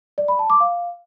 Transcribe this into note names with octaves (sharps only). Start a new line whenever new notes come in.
D5
B5
A5
D6
F5